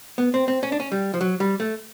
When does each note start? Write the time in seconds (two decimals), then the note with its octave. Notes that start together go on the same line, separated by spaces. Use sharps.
0.18 B3
0.34 C4
0.48 C4
0.63 C#4
0.72 D4
0.80 C#4
0.92 G3
1.14 F3
1.21 F#3
1.40 G3
1.60 A3